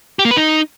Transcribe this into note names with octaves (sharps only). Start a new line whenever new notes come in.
G4
A#3
B4
D#4